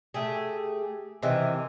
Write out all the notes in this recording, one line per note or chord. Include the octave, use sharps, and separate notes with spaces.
A3 G4 G#4
C3 D#3 E3